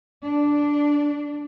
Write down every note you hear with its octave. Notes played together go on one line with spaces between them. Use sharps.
D4